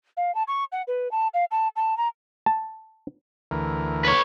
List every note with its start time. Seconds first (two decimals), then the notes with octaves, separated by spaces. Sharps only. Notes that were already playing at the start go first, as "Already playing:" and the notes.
0.17 F5
0.35 A5
0.48 C#6
0.72 F#5
0.88 B4
1.11 A5
1.34 F5
1.51 A5
1.76 A5
1.98 A#5
2.46 A5
3.51 D2 E3 A#4
4.04 B4 C#5